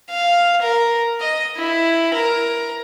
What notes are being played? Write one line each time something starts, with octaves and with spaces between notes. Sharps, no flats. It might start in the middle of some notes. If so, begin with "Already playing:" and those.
F5
A#4
D#5
E4
A#4